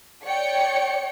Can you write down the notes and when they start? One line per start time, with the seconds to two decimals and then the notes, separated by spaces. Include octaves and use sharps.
0.24 C#5 D5 G5 C#7